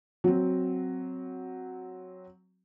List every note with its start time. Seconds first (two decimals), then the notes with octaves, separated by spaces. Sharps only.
0.24 F#3 C4